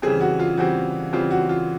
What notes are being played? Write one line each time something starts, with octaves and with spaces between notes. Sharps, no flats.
C#3 E3 G3 C4 G#4
F#4
F4
C#3 E3 G3 C4 F#4
C#3 E3 G3 C4 F4
F#4
F4